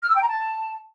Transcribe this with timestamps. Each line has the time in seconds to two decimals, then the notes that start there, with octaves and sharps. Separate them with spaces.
0.02 F6
0.09 E6
0.15 G5
0.21 A#5
0.28 A5